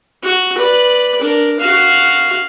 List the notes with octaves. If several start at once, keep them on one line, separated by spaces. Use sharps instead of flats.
F#4
B4 D5
D4 A#4
F#4 F5